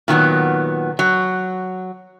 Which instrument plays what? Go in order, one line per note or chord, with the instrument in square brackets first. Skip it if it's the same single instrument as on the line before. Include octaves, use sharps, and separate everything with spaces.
[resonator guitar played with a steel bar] A#2 D#3 F#3 B3
F#3